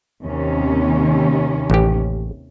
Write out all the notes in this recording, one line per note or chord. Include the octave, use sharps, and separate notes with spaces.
D#2 C3 C#4
A1 G4